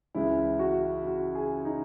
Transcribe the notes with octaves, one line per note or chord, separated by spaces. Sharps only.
C#2 C#3 E3 G#3 E4
F#4
F#4
G#4
D#4